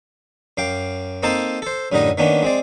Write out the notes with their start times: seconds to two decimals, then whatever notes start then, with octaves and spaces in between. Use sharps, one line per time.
0.57 F#2 F5 G5 D6
1.23 A#3 C4 D#4 A4 C5 A5
1.62 A4 C5
1.92 F#2 A2 D3 G3 D#4 D#5
2.18 D#3 A#3 B3 C#4 D4
2.43 G#3 C4 D5